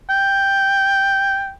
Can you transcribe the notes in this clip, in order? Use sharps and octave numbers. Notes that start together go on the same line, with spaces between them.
G5